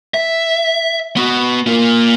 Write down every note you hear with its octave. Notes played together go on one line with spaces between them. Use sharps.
E5
B3 F#4
A#3 F4